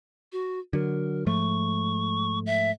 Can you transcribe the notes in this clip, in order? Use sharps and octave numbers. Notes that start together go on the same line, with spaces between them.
F#4
D3 F#3 A#4
G#2 F3 A3 C#6
E5